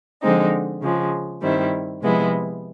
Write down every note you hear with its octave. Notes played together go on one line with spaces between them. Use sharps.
D3 F3 G#3 C4 D#4
C#3 F3 G#3
G2 D#3 G3 C4 E4
C3 F3 G#3 B3 E4